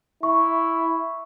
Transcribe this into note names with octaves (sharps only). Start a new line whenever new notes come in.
E4 C#6